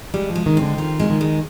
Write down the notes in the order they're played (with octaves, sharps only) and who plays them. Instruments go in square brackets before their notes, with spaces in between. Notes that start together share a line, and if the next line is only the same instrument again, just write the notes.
[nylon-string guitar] G3 [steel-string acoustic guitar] G#3
[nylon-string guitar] F3
[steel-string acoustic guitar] G#3
[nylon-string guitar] D#3
[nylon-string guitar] D3 [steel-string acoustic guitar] C4
[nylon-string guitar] D#3 [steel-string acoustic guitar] F4
[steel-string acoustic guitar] G#3
[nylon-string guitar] D#3
[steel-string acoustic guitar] G#3